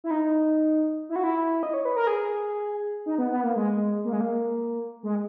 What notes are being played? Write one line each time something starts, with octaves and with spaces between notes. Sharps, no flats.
E4
D#4
E4
F#4
E4
D#5
C#5
B4
A#4
G#4
D#4
B3
B3
A#3
G#3
A#3
G#3
A#3
G#3